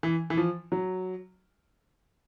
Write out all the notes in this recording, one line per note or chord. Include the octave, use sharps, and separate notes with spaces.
E3
E3
F3
F#3